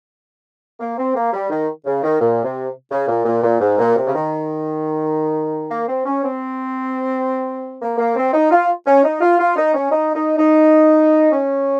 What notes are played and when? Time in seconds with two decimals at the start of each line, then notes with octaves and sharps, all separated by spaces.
0.80 A#3
0.98 C4
1.15 A#3
1.33 G3
1.50 D#3
1.85 C#3
2.03 D#3
2.20 A#2
2.43 C3
2.91 C#3
3.08 A#2
3.25 A#2
3.43 A#2
3.60 G#2
3.78 A#2
3.95 C3
4.07 C#3
4.14 D#3
5.71 A#3
5.88 C4
6.06 C#4
6.23 C4
7.81 A#3
7.98 A#3
8.16 C4
8.33 D#4
8.51 F4
8.86 C#4
9.04 D#4
9.21 F4
9.39 F4
9.56 D#4
9.74 C#4
9.91 D#4
10.15 D#4
10.38 D#4
11.32 C#4